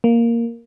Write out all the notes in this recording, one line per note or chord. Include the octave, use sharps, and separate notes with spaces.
A#3